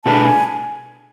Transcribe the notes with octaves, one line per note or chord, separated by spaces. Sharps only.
B2 A3 D4 G#4 B4 A5
G#5